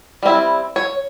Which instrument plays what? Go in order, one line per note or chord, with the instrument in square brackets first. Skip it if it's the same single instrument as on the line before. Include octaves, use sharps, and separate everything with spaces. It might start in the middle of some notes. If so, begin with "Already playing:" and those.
[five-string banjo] G3 C4 E4
C#5